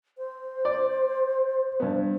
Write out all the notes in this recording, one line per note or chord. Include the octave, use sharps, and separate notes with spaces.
C5
D5
G2 B3